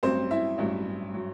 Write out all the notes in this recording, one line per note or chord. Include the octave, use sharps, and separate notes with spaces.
A1 G2 F#3 C4 C5
E4 E5
A1 G2 F#3
F#3